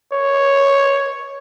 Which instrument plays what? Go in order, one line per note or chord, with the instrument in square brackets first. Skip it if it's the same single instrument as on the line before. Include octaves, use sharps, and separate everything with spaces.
[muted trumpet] C#5